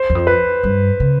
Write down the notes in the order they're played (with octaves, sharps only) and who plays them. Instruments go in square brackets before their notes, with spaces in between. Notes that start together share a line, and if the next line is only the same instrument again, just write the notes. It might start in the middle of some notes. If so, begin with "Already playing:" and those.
Already playing: [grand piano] C5
[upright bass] E2
F2
[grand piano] B4
[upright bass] G2
C#3